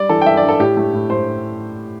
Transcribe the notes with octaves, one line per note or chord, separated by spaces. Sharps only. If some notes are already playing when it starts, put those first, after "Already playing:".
Already playing: G3 D5
E3 A4
G5
G2 E5
D5
G2
A4
A2 G4
A3
A2
A3 C5